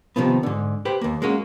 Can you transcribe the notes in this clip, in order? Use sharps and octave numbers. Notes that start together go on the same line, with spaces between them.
C3 D#3 F3 B3
G#2 D3
G4 B4 C5 G5
D#2 A#3
G#3 A#3 C#4 F#4